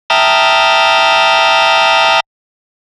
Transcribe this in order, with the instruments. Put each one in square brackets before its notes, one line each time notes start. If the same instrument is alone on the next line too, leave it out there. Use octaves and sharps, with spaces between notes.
[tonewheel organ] E5 G5 A5 A#5 D#6 F6